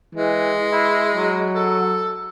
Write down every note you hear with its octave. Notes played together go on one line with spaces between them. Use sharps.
E3 G#3
E4
F#3
A4